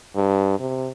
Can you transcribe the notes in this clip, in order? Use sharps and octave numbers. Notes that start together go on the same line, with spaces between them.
G2
C3